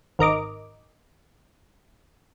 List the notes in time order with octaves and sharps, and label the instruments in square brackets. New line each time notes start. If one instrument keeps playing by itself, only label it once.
[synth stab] G#1 A#4 D#5 D6